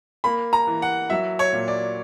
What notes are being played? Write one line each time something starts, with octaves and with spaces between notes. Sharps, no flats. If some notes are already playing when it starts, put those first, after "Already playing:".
A#3 B5
A#5
E3
F#5
F#3 E5
C#5
A#2
D5